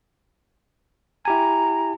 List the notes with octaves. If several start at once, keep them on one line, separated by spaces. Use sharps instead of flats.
E4 G4 G#5 A#5